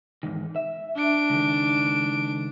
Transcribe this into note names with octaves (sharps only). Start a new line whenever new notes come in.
E2 G#2 D#3
E5
D4 D7
C#2 D#3